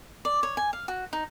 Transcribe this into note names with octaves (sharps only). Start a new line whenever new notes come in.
D5
C#5
G#5
F5
F#4
D#4